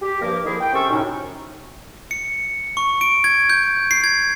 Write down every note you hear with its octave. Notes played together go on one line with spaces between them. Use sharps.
G4
G2 F3 A#3 A#4 D6
D#3 F3 E4 G#4 A#4
G5
C3 C#4 A4 C#6
F#2 A2 C3 C#4 D#4
C#7
C#6
D7
G#6
G6
C7
G#6